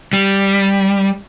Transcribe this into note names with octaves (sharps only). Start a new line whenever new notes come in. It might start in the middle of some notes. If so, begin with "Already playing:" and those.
G3